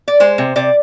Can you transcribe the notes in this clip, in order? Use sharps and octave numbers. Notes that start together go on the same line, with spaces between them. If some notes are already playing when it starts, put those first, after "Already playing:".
D5
G#3 C5
C3
C3 D5